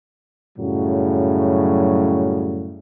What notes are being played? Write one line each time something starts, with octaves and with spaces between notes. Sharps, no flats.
F#2 A2 C#3 F#3 G3